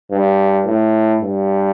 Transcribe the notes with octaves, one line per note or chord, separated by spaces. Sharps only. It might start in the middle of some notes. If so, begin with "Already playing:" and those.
G2
A2
G2